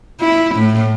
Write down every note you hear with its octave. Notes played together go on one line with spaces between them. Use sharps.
E4
A2